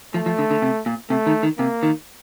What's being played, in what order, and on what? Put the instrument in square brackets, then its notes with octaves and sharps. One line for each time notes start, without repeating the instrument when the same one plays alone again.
[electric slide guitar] F3 [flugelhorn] A3
[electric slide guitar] F3
D3
D3
C3
A#2
[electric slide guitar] C3 [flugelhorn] A3
[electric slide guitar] D#3
D#3
[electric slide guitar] C3 [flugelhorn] A#3
[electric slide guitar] D#3